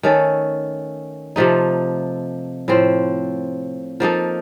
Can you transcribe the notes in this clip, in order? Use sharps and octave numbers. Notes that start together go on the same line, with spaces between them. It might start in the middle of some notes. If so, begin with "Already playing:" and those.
D#3 A3 C#4 A4
C3 F3 A3 D#4
A2 F3 C4
F3 A#3 D#4 A4